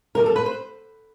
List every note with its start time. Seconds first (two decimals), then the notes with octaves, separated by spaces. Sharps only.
0.15 F#2 D#3 G3 A#4
0.26 A4
0.36 B4
0.46 C5